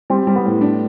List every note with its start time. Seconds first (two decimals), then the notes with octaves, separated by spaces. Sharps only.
0.10 G3 C4
0.27 G3
0.36 B3
0.45 A2
0.61 D4